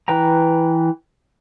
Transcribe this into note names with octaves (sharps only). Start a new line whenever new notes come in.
E3 B4 G5 A#5